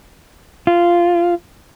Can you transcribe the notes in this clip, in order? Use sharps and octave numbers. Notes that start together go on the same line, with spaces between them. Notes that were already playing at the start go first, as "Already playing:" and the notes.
F4